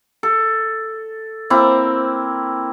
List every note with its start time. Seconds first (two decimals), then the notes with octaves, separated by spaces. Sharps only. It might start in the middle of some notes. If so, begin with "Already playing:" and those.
0.23 A4
1.50 A#3 C4 E4